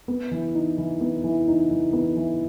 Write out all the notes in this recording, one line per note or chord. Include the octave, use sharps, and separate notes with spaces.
B3
E3
D#4
E3
B3
E3
D#4
E3
B3
E3